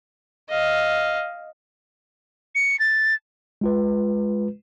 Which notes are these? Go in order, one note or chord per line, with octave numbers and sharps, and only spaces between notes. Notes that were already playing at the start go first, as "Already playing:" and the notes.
D#5 F5
C#7
A6
G#3 F4 B4